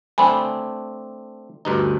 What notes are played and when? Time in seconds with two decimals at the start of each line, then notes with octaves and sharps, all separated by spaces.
0.18 A3 C4 D4 G#5 B5
1.65 D2 G2 D#4